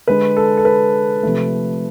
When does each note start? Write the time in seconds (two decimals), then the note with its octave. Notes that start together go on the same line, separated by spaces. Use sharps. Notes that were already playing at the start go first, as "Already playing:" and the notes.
0.08 D3 G#3 B4
0.37 A4
0.57 A4
0.65 B4
1.23 C3 F3 A3